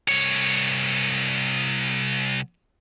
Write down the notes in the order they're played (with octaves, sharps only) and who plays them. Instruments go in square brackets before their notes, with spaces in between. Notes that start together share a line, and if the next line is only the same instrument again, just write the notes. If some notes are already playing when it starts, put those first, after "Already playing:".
[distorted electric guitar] C2 C#5